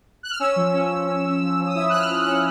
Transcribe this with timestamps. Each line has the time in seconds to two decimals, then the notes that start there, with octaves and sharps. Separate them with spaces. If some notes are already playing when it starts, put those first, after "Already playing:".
0.23 F#6
0.31 F6
0.39 C#4 E6
0.56 F3
0.73 C#4
0.91 F3
1.07 C#4
1.24 C#4
1.41 F3
1.59 F3
1.67 D#6
1.75 E4 E6
1.90 F3 F#6
1.99 F6
2.09 F3
2.21 F#6
2.26 C#4